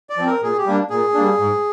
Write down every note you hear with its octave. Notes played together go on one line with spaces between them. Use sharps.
D5
F3 C4
A#4
A#2 G#4
G4
G3 A#3 D4
A#2 G#4
G3 A#3 D4
G#2